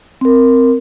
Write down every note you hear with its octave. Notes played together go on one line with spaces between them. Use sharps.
C4 A#4